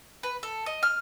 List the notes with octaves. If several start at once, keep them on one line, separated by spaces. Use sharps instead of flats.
B4
A4
D#5
F6